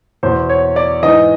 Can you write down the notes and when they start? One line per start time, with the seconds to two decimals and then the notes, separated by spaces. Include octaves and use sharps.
0.23 E2 B2 C5
0.49 C#5
0.76 D5
1.03 G#2 E3 D#5